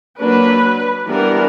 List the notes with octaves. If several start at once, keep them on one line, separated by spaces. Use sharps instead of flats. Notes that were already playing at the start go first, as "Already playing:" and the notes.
F#3 A#3 D4 B4
E3 G3 B3 D4 A#4